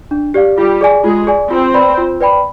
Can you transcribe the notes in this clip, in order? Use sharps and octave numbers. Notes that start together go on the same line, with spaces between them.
D4
G4 D5 F5
G3 F4 G4
G#4 D5 G#5
G#3 F4 G#4
G#4 D5 G#5
C4 F4 C5
B4 D5 G5 B5
F4
B4 D5 G5 B5